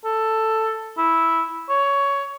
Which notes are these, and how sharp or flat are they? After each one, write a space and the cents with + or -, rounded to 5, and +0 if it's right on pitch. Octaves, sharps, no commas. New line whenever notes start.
A4 +10
E4 -5
C#5 +15